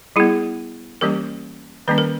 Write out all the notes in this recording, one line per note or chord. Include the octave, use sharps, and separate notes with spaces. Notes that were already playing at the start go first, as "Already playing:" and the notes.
G3 B3 E4 G#4
E3 G3 A#3 C#4 G4 A#4
D#3 G3 A#3 C#4 B4
A#4